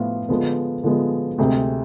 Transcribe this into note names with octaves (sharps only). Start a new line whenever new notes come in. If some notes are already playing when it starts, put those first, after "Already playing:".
Already playing: A2 F3 B3 F4
D3 F3 G#3 B3
D3 F3 G#3 B3
D2 C3 G#3 C4 G#4